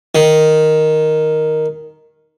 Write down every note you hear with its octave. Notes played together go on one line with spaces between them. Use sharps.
D#3